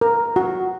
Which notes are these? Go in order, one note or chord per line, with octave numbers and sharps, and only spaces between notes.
A#4
F#4